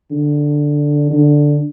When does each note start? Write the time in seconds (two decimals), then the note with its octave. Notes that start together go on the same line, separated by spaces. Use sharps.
0.11 D3
1.11 D3